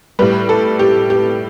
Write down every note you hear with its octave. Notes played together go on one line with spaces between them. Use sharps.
A2 G3 G4 B4
A4
G4
G4